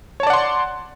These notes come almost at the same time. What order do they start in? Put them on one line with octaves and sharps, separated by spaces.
C#5 A5 D5 F#5 C6